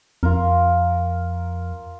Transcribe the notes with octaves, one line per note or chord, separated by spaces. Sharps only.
F2 F4 A#4